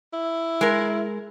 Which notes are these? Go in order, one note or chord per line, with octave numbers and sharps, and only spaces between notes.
E4
G#3 A#4